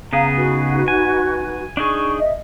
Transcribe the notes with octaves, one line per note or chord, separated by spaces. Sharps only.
C#3 B3 G#4 F5 A#5
D#4 F#4 B4
G#5
D4 D#4 G#4 C#6
D#5 E5